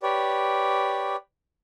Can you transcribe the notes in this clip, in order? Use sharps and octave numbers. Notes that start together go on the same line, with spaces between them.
G4 B4 C#5 D5